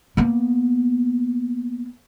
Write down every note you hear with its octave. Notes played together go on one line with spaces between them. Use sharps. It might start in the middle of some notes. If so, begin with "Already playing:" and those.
A#3 B3